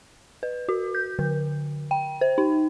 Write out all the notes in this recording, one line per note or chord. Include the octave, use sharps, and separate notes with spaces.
B4
F#4
G6
D3
G5
C5
D#4